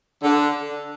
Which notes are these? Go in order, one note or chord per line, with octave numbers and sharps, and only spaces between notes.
D3